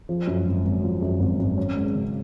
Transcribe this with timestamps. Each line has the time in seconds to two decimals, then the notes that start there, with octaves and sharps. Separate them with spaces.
0.09 F3
0.27 F#2
0.46 G#1
0.65 G#1
0.83 F3
1.02 F#2
1.20 G#1
1.39 G#1
1.58 C#4
1.77 G#3
1.94 C#3